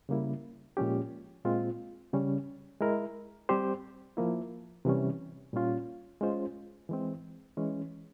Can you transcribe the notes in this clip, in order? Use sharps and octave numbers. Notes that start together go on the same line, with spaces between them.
C#3 G3 A#3 E4
A#2 F3 G#3 C#4 G4
A#2 G#3 C4 F4
C#3 G3 C#4
G#3 E4 A#4
G3 C4 G4 C5
F3 A#3 E4
C3 E3 G3 C#4
A#2 G3 C#4 F4
G#3 C#4 F4 C5
E3 G#3 C4
E3 G#3 C#4